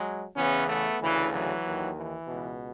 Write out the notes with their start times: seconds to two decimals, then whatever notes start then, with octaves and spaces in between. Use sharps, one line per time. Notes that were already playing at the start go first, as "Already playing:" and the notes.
Already playing: F#3 G#3
0.36 E2 C#3 E3 B3 C#4
0.68 A3 B3
1.00 D2 C#3 E3
1.32 E3 F#3
1.64 D#2 D#3
1.96 E3
2.28 C#2 B2